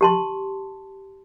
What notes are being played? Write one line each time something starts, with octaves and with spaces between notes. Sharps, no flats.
G4 A5 C6